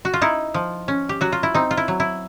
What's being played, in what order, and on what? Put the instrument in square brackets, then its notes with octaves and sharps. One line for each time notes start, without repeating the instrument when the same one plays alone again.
[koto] F#4
F4
D#4 E4
F3
C#4
G4
F#3 F#4
F4
E4
C4 D#4
F4
E4
F#3
E4